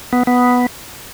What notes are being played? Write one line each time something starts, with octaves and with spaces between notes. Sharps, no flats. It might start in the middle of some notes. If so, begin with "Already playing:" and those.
B3
B3